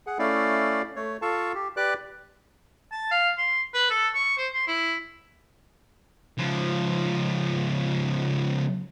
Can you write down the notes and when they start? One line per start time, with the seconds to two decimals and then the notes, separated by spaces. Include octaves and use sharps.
0.07 G#4 F#5
0.19 A3 C#4 E4 D5 F5
0.96 A3 C#5
1.22 F4 A4 F5 A5 C#6
1.55 G4
1.77 G4 B4 D5 D6 F#6
2.92 A5
3.11 F5
3.37 C6
3.74 B4
3.90 A4
4.15 C#6
4.37 C5
4.54 C6
4.67 E4
6.38 C#2 F3